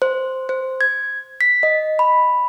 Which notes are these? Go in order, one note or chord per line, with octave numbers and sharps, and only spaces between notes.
C5
C5
G#6
B6
D#5
B5